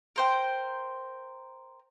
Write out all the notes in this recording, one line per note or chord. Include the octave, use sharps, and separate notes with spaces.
A#4 C5 G5